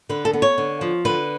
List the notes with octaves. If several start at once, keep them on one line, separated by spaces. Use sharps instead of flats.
D3 B4
A4
B3
C#5
D3
F3
D3 B4